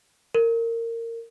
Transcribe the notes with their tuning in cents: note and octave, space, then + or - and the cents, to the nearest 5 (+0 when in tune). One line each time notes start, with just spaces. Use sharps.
A#4 -20